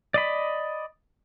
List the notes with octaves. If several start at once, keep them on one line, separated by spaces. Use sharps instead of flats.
D5 D#5 B5